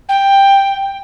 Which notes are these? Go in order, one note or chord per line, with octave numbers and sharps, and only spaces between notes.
G5